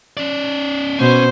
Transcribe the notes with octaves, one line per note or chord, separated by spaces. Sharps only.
C#4 D5
B2 C#4 C5